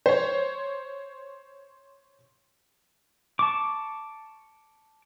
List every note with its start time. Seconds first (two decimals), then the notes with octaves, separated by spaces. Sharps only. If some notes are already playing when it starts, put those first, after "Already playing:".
0.06 C5 C#5
3.39 A5 C#6 D6